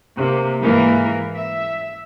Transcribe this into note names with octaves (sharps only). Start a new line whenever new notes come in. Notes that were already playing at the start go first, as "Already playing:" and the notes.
C3 A#3
G#2 E3 A#3 A#4
E5